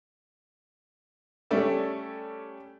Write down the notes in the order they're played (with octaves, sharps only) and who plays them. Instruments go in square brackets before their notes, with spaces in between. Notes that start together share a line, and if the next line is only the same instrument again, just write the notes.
[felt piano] G3 A3 C#4 A4 D5 E5